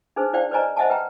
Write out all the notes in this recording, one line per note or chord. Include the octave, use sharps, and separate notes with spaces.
D4 D#4 G#4 B4 C5
E4 C5 D5 F5 G5
B4 C5 D5 D#5 G#5 A#5
C5 D#5 E5 F#5 G#5 A5
B4 G5 A#5